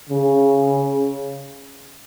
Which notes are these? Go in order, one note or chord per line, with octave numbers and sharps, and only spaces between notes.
C#3